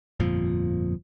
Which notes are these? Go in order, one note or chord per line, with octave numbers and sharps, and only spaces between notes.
G1 F2 A#2 F3